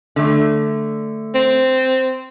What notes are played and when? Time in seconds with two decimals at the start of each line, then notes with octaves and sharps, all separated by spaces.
0.16 D3 A3
1.35 C4